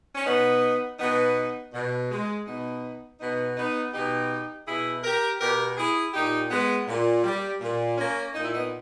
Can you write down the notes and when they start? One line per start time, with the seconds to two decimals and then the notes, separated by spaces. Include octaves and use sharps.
0.15 C#4
0.26 B2 B3 D#4
1.00 B2 B3 D#4
1.73 B2
2.10 G#3
2.46 B2 B3 D#4
3.20 B2 B3 D#4
3.57 B3 D#4
3.93 B2 D#4 G4
4.67 B2 E4 G#4
5.04 G4 A#4
5.40 B2 G4 A#4
5.77 E4 G#4
6.14 A#2 D#4 G4
6.51 G#3 B3
6.87 A#2
7.24 G3
7.61 A#2
7.98 A#3 C#4
8.34 A#2 D#4
8.45 E4
8.54 B3 D#4